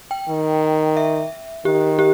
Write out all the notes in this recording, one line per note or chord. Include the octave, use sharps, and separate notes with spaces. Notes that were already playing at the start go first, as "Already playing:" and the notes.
G5
D#3
E5
D#3 G4
G4